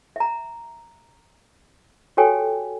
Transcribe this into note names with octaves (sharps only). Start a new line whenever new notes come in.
E5 A#5
F#4 G4 A4 C#5 G5 G#5